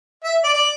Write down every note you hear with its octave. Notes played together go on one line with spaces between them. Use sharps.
E5
D5
D5